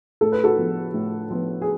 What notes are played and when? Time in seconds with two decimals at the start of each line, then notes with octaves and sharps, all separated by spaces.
0.21 A2 A4
0.32 B4
0.44 F#4 A4
0.57 F3 B3
0.94 A2
1.30 F3 B3
1.62 G#4